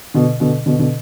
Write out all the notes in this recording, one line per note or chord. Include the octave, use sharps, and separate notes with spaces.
B2 D3
B2 D3
B2 D3
B2 D3